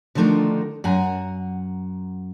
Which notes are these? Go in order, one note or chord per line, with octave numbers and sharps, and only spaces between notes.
D3 D#3 F3 A3 D4 D#4
F#2 F#5 G#5 A#5